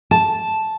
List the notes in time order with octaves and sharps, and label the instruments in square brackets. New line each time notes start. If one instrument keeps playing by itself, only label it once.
[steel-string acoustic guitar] A5